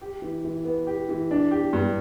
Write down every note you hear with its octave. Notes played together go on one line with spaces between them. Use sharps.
G4
E3
E3
B3
G4
E3
D4
G4
G2